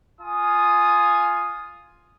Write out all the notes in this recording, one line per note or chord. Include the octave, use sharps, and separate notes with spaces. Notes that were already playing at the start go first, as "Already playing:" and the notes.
F4 G#5 D#6